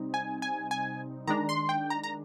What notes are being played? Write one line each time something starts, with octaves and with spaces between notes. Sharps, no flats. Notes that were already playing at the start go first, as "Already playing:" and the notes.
Already playing: C3 G3 C4 D#4
G#5
G#5
G#5
D#3 G#3 D4 A#5
C6
G5
A#5
A#5